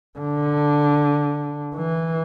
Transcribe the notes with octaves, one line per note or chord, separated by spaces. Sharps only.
D3
E3